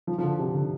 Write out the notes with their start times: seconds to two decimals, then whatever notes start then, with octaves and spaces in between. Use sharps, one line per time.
0.07 F3
0.18 F3
0.23 D3
0.39 C3
0.54 D3